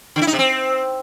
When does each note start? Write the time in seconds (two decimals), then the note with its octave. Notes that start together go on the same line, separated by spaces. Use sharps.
0.16 D3
0.22 E4
0.27 D#4
0.33 C3
0.39 C4